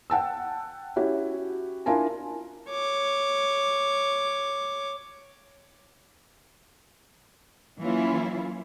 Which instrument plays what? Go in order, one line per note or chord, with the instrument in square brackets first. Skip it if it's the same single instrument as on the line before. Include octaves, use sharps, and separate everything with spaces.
[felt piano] F#5 G5 A5 E6
C#4 E4 F#4 G4
D4 E4 F4 A#4 G#5 A5
[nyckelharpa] C#5 D6
[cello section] E3 F#3 A#3 C#4 E4 F4